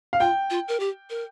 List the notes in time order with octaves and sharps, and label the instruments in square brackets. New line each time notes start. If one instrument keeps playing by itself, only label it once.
[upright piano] F5
[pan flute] F4 [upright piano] G5
[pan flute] F4
A#4
G4
A#4